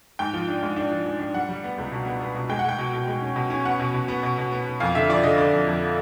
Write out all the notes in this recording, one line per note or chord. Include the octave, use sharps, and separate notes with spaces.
G#2 G5
F3
D4
G#2
D4
F3
G#2
D4
G3 F#5
G3
B3
C#2
B2
B3
B3
B2
G#3 G5
F#5
G#3 G5
B2
B2
G#3
C#4
B2
C#4
B3 F#5
B2
B2
B3
B2
B2
B3
B3
F2 F5
D3 E5
F3 D5
D3 D#5
D3 D5
F2
F2